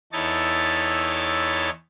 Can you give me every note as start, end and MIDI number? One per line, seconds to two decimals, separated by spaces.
0.12 1.70 40
0.12 1.70 63
0.12 1.70 64
0.12 1.70 69
0.12 1.70 73
0.12 1.70 93